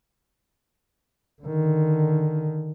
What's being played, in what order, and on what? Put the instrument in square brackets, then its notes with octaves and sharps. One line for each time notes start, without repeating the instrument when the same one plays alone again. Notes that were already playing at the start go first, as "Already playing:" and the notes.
[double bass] D3 D#3